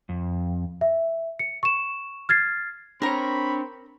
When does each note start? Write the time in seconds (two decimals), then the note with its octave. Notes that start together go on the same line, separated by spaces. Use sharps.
0.09 F2
0.81 E5
1.39 C#7
1.63 C#6 E7
2.29 F6 G#6 A6 C7
3.02 C4 D4 A#4 C#5 A#5 B5